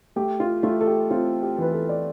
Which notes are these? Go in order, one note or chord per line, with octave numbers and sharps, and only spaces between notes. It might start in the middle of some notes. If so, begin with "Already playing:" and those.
A3 G4
F4
A3 F4
A4
G4
C4 F4
G4
E3 B4
A4
D5